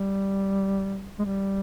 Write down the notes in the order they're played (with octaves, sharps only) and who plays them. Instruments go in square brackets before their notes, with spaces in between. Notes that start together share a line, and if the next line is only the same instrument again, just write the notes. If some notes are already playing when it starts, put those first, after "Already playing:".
Already playing: [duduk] G3
G#3
G3